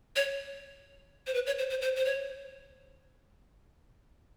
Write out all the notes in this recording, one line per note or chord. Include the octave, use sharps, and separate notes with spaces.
C#5
C5
B4
C#5
C5
C5
C5
C5
C#5